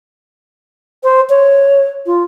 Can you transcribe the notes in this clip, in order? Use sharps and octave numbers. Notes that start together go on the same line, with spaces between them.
C5
C#5
F4